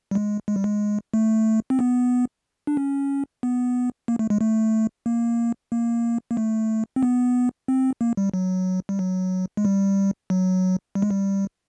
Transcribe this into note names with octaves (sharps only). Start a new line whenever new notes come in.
G3
G#3
G#3
G3
G#3
A3
C4
B3
D4
C#4
B3
A#3
A3
G#3
A3
A#3
A#3
A#3
A3
C4
B3
C4
A#3
G3
F#3
G3
F#3
G#3
G3
F#3
G3
G#3
G3